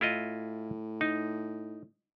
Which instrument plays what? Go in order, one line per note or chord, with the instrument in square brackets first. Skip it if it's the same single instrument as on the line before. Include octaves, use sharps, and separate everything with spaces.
[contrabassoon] A2 [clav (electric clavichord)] E4 F4 D#5
[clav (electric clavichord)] D#4